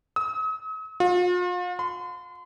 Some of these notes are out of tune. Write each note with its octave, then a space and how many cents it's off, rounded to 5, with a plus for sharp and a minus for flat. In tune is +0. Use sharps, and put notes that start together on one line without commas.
D#6 +45
F4 +40
C6 -40